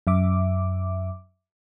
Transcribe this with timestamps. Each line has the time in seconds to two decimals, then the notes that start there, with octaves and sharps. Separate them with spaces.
0.07 F#2 E5 D6